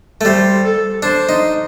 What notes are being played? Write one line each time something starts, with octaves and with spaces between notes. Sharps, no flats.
A3
G3 C5
A4
D4 C5
D#4